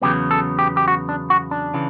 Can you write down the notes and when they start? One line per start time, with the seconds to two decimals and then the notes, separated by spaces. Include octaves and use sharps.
0.02 E2 C#3 F#3 B3 G4
0.31 A4
0.59 G4
0.77 G4
0.88 F#4
1.09 D4
1.30 F#4
1.51 D4
1.74 C#3 E3